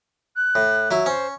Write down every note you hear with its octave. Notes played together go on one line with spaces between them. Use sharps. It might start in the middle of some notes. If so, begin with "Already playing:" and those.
F#6
A2
F#3 E4
C#4 C5